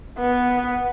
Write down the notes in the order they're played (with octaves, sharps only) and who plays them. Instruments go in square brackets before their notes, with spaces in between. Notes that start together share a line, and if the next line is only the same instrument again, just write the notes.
[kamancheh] B3